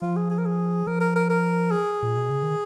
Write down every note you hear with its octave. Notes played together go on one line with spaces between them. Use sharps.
F3 F4
G#4
G#4
A#4
G#4
F3 A#4
A#4
A#4
A#4
G#4
A#2
B2
C#3
D#3